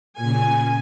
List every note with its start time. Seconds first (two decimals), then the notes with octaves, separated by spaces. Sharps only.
0.17 A#2 C#3 G#5